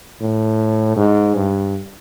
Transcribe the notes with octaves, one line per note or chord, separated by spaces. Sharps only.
A2
G#2
G2